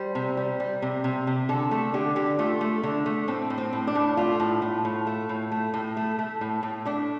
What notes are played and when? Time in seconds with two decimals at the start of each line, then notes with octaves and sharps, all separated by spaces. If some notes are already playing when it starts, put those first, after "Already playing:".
Already playing: G3 C5
0.15 C3
0.37 G3
0.60 G3
0.82 C3
1.04 C3
1.27 C3
1.49 D3 A4
1.71 A3 A4
1.94 D3 G4
2.16 D3 G4
2.39 A3 F4
2.61 A3
2.83 D3 D4
3.06 A3
3.28 A2 C4
3.50 A2
3.58 C4
3.73 A2
3.87 D4
3.95 A2
4.17 A3 F4
4.40 A2
4.62 A2
4.85 A2
5.07 A3
5.29 A2
5.52 A3
5.74 A2
5.97 A3
6.19 A3
6.41 A2
6.63 A2
6.85 A3 D4